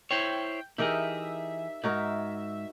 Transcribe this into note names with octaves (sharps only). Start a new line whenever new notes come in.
E4 C5 C#5 G5
E3 D#4 G4 G#4 A#4 E5
G#2 D#4 F#4 A#4